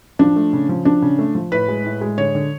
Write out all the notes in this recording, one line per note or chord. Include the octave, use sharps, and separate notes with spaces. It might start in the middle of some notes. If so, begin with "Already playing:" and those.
F3 D4
A3
C#3
F3
F3 D4
C#3
A3
F3
A2 B4
G#3
A2
G#3
D3 C#5
D3